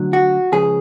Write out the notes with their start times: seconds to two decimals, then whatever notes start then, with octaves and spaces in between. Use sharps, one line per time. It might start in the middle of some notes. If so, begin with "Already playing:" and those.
Already playing: D2 D3 F#3
0.13 F#4
0.52 C#2 C#3 F3 G#4